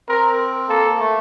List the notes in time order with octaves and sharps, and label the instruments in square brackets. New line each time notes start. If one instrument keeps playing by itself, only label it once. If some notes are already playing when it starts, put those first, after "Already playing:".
[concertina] C4 [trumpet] A#4
[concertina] A#3 [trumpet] A4
[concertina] A3